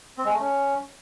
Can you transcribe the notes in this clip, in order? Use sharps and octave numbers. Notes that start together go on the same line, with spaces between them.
C4
G#3
A3
C#4